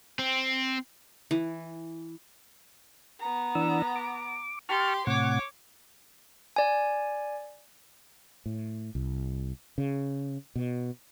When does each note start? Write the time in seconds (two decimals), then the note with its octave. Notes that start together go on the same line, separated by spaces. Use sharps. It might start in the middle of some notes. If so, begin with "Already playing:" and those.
0.19 C4
1.31 E3
3.20 B3 A#5
3.55 E3 D4 E6
3.96 D6
4.69 G4 A5 C6 C#6 F6
5.07 A2 C3 C#5 F#5 D6
6.56 D5 G#5
8.46 A2
8.95 C2
9.78 C#3
10.56 B2